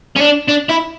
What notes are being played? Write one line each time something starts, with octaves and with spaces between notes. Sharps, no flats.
C#4
D4
D4
E4